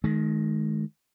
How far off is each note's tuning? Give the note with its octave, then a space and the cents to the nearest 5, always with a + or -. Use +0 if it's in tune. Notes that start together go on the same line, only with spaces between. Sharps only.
D#3 +0 G#3 +40